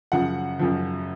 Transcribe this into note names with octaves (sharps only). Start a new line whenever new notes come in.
F#2 C#3 F3 F#5
F#2 C#3 F3